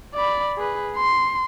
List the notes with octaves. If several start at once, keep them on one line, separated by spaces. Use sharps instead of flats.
D5 B5
G#4 B4
C6